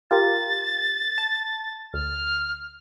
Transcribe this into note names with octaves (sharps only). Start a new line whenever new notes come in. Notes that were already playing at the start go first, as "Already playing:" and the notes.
F4 G4 A#4 A6
A5
D2 F6